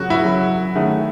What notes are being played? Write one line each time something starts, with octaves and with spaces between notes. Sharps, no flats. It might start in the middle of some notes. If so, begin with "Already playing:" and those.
Already playing: C#3 F#3 C#4 F#4
E4
C#3 F#3 C#4
D#3 A3 C#4 E4 G#4